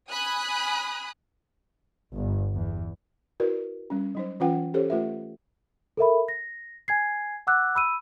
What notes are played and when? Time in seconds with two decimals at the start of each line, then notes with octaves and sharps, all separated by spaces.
0.10 G#5 B5 D#6 F#6
2.14 G1
2.53 E2
3.40 E4 F#4 A#4 B4 D5
3.90 G3 C#4
4.15 F#3 D#4 C5
4.40 E3 C#4 F4 B4 F#5 G5
4.74 C#4 G4 A4 C5 C#5
4.90 A3 F4 B4 E5
5.97 A4 A#4 E5 B5
6.28 A#6
6.88 G#5 G#6 C7
7.47 F#5 D6 E6 F#6
7.75 B5 E6 D#7